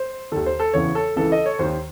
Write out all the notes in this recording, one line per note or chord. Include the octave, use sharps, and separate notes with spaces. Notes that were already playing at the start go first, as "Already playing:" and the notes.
Already playing: C5
D#2 D#3 A4
C5
A4
E2 C#3 E3 C#5
A4
C#2 C#3 E3 A4
D#5
C#5
D#2 D#3 C5